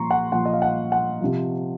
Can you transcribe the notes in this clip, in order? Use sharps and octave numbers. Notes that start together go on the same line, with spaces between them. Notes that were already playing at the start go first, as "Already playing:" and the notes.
Already playing: A#2 F3 A#5 C6 C#6
F#5
A#2 F3 F#5
D#5
F5
F#5
F#5
C3 F3